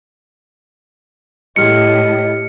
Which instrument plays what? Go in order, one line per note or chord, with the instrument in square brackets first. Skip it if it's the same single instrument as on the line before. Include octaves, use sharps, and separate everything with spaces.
[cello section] A2 [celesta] E4 G4 F6 [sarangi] D#5 [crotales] C#7